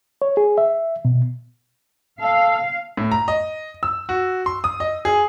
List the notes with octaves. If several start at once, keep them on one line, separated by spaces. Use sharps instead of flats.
C#5
G#4
E5
B2
A4 F5
A2
A#5
D#5
E6
F#4
C6
D#6
D#5
G#4